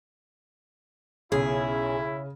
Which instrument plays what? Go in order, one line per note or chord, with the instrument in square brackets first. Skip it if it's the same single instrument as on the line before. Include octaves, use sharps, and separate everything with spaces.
[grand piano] B1 [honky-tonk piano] C#3 [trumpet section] C#4 E4 [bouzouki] G#4